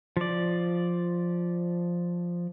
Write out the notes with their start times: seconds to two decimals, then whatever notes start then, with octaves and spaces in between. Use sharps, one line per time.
0.17 F3 D5